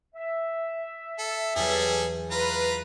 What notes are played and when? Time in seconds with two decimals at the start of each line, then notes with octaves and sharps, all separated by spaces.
0.15 E5
1.19 A4
1.56 E2 F#3 G3 G#4 A4
2.31 F4 B4 A#5